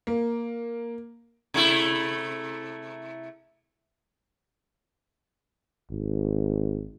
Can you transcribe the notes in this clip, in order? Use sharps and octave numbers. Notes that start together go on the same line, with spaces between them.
A#3
C3 A3 E4
G#1